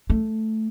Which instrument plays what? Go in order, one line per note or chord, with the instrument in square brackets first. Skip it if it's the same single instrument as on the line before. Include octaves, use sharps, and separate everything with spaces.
[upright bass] A3